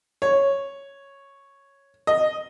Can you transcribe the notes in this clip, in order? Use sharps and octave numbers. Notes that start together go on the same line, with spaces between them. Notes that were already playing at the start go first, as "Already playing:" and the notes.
C#5
D#5